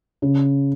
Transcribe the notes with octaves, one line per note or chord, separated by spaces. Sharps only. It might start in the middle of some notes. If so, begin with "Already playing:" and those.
C#3